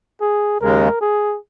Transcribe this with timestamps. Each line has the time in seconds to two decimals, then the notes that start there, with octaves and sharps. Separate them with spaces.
0.21 G#4
0.60 D#2 C#3 G#3 A#4
1.01 G#4